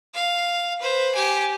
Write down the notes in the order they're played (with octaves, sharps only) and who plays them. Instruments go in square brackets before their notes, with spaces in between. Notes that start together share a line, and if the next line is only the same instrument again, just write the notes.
[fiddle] F5
B4 C5
G4 G#5